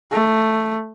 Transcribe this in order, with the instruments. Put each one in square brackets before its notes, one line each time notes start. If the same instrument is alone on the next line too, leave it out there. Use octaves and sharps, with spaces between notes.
[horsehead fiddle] A3